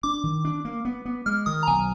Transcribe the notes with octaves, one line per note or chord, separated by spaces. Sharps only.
D4 D6
D#3
D4
A#3
B3
B3
G#3 F6
D#3 D#6
A#5
B1 G#5